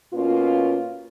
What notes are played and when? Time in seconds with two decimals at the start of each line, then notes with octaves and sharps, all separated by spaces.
0.13 B2 A#3 C#4 F4